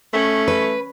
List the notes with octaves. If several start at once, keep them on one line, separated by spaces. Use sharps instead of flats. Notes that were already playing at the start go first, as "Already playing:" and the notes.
A3 C#4
B4